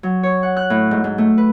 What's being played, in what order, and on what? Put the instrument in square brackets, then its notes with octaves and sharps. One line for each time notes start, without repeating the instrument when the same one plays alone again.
[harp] F#3
C#5
F#5
F#6
A2
G#2
G#2
A3
B4